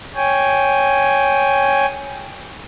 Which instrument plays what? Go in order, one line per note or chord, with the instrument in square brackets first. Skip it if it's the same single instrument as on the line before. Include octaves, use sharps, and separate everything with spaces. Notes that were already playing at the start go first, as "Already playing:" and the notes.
[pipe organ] C#5 G5 G#5